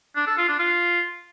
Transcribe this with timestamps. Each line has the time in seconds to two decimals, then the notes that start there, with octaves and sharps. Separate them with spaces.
0.16 D4
0.27 A4
0.37 F4
0.48 D4
0.59 F4